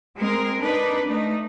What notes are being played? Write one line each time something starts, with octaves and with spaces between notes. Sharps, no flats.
G#3 C4 A#4
D4 D#4 B4 D5
A3 D#4